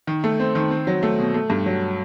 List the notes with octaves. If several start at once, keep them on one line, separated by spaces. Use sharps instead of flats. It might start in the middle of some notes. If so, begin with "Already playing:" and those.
D#3
A3
C4
D#3
C4
F#3
A3
B2
A3
G2
F#3